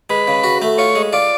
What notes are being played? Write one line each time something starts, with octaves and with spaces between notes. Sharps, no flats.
G#3 B4
C#3
F#4
A3
F4 C#5
G#3
F4 D5